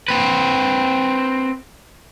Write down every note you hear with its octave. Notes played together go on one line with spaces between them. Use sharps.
C4 B4